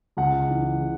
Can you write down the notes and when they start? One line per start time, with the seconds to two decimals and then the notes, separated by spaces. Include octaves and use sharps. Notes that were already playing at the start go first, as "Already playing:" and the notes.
0.17 C#2 F#5
0.50 E3
0.81 C#3